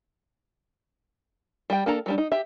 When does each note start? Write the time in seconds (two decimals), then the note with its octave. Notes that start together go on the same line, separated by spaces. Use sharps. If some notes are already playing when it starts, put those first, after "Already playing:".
1.70 G3 G5
1.86 A#3 D4 A4 A#5
2.06 F#3 G3 D4
2.18 D#4
2.32 G4 E5